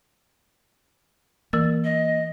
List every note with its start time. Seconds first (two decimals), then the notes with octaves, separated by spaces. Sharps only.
1.53 E3 A#3 A#4 A6
1.84 D#5